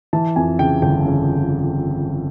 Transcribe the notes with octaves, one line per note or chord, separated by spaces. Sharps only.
E3 A5
F2 G#5
C#3 G5
G1 G5
C#3